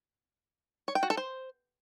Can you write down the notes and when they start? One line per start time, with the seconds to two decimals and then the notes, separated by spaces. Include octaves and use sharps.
0.88 C#5
0.95 G5
1.03 F#4
1.10 A4
1.17 C5